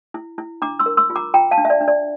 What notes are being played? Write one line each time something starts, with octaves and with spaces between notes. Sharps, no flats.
E4
E4
D4 A#5 D6
C6 E6
A#4
C6 E6
F4
A#5 D6
F4 G5 A#5
F5 A5
D4
E5
D5
D4
D5